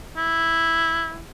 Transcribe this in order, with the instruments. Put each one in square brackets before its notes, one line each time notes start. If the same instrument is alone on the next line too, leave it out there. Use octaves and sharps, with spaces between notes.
[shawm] E4